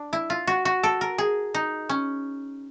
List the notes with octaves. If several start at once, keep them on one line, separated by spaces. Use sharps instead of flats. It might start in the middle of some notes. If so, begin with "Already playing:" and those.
Already playing: D4
E4
F4
F#4
F#4
A4
A#4
G#4
D#4
C#4